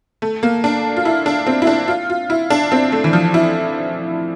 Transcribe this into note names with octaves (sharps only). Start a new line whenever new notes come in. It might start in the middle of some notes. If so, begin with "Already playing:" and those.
A3
A#3
D4
F4
E4
D4
C4
E4
D4
F4
F4
E4
D4
C4
A3
E3
F3
E4